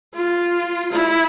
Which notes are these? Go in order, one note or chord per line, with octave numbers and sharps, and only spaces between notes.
F4
E4